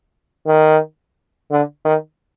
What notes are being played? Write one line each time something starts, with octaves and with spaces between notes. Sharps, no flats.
D#3
D3
D#3